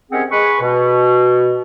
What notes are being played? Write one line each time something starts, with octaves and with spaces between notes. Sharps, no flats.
C3 D#3 C4 C#4 G#4 F#5
G#3 B4 C#6
B2